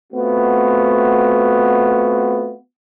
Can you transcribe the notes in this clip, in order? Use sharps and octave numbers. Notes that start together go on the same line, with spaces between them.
A3 B3 C4 F4 F#4